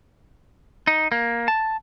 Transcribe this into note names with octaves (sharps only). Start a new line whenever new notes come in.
D#4
A#3
A5